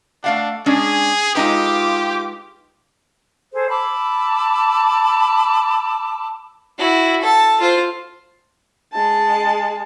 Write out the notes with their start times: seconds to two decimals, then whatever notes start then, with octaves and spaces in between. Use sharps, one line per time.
0.24 A3 D4 F5 F#5
0.66 G#3 C#4 D4 G#4
1.35 G#3 D#4 F4 G4 B4 D6
3.53 G#4 A4 C5
3.69 A5 B5 D6 E6
6.78 E4 F#4
7.21 A4 A5
7.60 F4 C5
8.93 G#3 A5